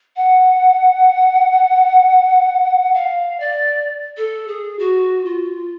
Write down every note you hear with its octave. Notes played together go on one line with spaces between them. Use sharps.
F#5
F5
D5
A4
G#4
F#4
F4